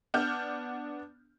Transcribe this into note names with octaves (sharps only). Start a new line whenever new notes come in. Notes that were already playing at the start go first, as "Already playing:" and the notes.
B3 D4 F6 G6